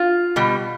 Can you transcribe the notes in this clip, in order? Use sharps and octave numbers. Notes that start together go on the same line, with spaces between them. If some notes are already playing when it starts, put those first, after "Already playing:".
Already playing: F4
B2 G3